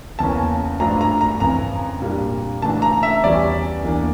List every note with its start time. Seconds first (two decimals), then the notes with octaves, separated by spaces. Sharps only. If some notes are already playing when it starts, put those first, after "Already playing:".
0.19 E2 C#3 E3 A#3 C#4 A5
0.80 G2 F3 A3 D4 A#5
1.01 A#5
1.21 A#5
1.40 F2 C#3 E3 A#5
2.02 A#2 G3 D4
2.62 C#3 E3 A3 D4 A5
2.82 A#5
3.03 E5
3.23 E2 E3 G3 C#4 D5
3.83 E2 E3 A#3 D4